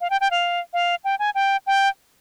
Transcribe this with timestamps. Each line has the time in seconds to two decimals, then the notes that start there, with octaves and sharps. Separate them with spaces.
0.01 F5
0.10 G5
0.21 G5
0.31 F5
0.73 F5
1.04 G5
1.19 G#5
1.35 G5
1.67 G5